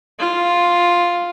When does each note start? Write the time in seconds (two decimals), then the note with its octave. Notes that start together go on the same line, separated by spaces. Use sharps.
0.20 F4